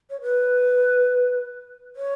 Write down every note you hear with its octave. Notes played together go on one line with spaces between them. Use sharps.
C#5
B4
C#5